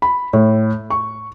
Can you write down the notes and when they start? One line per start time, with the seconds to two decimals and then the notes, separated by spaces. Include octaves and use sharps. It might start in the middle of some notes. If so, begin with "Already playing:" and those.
0.02 B5
0.33 A2
0.90 C#6